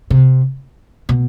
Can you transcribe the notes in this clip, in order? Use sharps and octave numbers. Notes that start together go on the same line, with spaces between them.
C3
B2